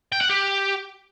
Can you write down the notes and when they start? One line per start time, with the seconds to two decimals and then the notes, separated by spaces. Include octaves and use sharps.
0.12 G5
0.21 F#5
0.30 G4